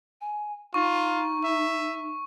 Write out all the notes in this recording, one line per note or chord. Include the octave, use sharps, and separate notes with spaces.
G#5
D#4 F4 C#6
E5